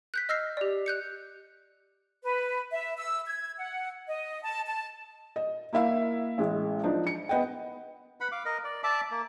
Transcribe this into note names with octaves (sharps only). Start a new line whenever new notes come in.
F#6 G6 B6
D#5 E6 F6 A#6 C7
G4 D5
F#6 G6 C#7
B4
E5
E6
G#6
F#5
D#5
A5
A5
D#5
A#3 E4 E5 F5
A1 G#3
F3 D4 D#4
C#7
B3 D#5 F#5 G5
B4 F#5 B5
F5 D6
A#4 D#5
D5
D5 E5 A5 D6
A#3